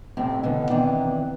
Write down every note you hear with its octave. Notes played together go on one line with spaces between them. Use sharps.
F2 A2 C3 C4 C#4
B2 D3 E3 B3
D#3 E3 B3 C4 D4